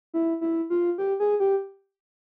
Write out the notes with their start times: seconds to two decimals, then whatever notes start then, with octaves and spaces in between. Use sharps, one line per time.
0.14 E4
0.41 E4
0.70 F4
0.98 G4
1.20 G#4
1.40 G4